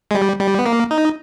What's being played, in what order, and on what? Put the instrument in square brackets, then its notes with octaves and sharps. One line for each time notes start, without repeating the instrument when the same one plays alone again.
[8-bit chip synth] G#3
G3
G3
B3
A#3
D#4